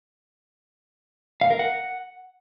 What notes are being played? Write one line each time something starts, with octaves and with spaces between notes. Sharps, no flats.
F5
A#4
F#5